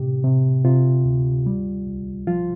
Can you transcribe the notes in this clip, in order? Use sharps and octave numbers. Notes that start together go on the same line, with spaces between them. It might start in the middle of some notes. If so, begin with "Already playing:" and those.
Already playing: A2 C3 G4
C3
C3 F4
D2
G3
C2
F3 F4